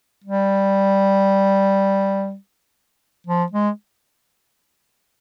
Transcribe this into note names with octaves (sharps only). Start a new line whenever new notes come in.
G3
F3
G#3